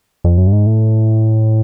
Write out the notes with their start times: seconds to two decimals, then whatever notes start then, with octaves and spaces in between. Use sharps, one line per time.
0.24 F2
0.38 F#2
0.47 G2
0.52 G#2
0.66 A2